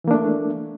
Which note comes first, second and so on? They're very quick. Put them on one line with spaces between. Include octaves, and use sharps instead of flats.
E3 A#3 D4 A3